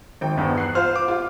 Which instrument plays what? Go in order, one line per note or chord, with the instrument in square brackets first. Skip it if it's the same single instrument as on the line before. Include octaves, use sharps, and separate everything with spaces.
[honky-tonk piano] G#1 G5
[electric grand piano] E2 G2 B3
[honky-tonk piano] F#6 C7
[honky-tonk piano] F4 C5 [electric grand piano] F6
[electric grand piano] D6
[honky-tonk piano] F4 G4